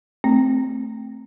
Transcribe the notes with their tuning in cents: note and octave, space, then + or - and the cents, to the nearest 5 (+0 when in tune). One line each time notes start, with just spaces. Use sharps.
A3 +0 C4 +0